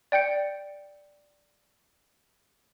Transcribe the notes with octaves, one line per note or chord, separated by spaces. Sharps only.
D5 G5 G6 C#7